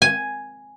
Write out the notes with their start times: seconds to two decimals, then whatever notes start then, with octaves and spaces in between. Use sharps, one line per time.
0.02 G#5